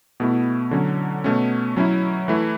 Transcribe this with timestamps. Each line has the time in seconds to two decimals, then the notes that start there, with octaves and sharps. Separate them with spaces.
0.20 B2 A3 E4
0.71 D3 F#3 C#4
1.24 B2 A3 C#4
1.76 F#3 C#4 E4
2.28 E3 A3 E4